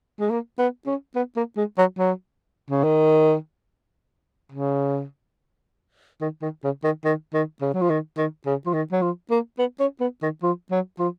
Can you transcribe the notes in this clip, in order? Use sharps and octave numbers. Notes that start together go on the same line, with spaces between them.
G#3
A#3
B3
C#4
B3
A#3
G#3
F#3
F#3
C#3
D#3
C#3
D#3
D#3
C#3
D#3
D#3
D#3
C#3
F#3
F3
D#3
D#3
C#3
F3
D#3
F#3
F3
A#3
B3
C#4
B3
D#3
F3
F#3
F3